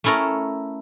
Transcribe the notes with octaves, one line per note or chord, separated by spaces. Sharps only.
A3 C#4 E4 A4 A#4